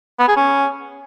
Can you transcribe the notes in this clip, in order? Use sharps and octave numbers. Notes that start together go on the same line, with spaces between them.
B3
G#4
C#4